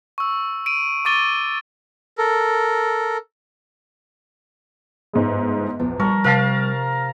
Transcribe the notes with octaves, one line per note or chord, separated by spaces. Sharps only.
C#6 E6
D7 D#7
C#6 D6 A6 D#7 G7
A4 A#4
G1 G#2 G#3
A#1 E2
G3 A#4 A5 C#6
C3 A#4 F5 A5 F#6